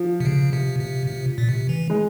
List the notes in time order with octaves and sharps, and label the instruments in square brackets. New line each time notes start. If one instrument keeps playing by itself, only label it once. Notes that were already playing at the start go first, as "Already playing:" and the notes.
Already playing: [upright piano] F3
[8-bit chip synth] C3
C#3
C3
C3
C3
A#2
C3
E3
[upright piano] G#3